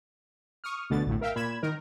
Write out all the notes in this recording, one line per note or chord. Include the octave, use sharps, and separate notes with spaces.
C#6 D#6 F6
D2 B2 D3 A6
A1 D2 A2
A#4 E5 F5 G5
A#2 B5 G#6 E7
D#3 D#4 A#4